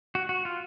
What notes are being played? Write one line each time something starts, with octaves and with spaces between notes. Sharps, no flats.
F#4
F#4
F4